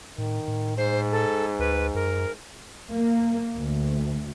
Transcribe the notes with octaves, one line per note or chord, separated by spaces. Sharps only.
A2 D#3
A2
G#2 C5
A4
D2 B4
F#2 A#4
A#3
D2